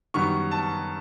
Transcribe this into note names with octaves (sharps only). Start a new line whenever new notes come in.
F#2 D#3 G3 B3 C#6
A5